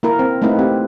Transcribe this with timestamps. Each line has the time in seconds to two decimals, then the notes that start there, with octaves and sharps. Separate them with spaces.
0.03 A#3 E4 A#4
0.19 C4
0.42 A3 A#3 C4 D#4 E4 B4
0.59 C4 G4